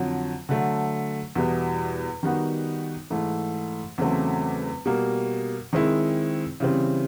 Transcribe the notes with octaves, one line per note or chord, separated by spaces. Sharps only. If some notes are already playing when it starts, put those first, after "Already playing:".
Already playing: F2 D3 F#3
D3 F#3 A3
E2 B2 G3 B3 E4
D#3 G3 B3 D#4 F#4
G#2 E3 A3
E2 C#3 F#3 A3 C4
B2 G3 A#3
D#3 G#3 C4 E4
C#3 E3 G3 C4